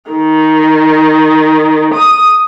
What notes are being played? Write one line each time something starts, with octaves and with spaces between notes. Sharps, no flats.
D#3
D#6